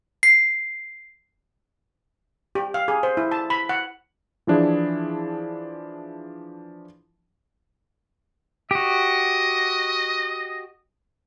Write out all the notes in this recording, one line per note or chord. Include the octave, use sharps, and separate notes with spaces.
C7
G4
F5
G#4
C5
E4
A5
B5
F#5
E3 F3 D4 E4 G#4
F#4 G4 D#5